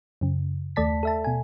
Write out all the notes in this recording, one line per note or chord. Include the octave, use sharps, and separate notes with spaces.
F#2 C#3
D#2 A3 D5 A5 B6
A4 E5 A5
B2 G#5